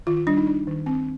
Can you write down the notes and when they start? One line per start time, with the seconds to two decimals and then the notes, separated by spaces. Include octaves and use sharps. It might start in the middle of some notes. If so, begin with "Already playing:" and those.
0.07 D#3 F4
0.17 F4
0.27 G3 D4
0.37 D#4
0.47 D4
0.67 D#3
0.86 C4